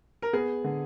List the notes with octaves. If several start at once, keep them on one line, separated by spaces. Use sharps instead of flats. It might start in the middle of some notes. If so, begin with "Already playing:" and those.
A#4
B3 G#4
D3